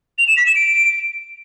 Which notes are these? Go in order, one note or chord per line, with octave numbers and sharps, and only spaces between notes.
F7
E7
B6
E7
D7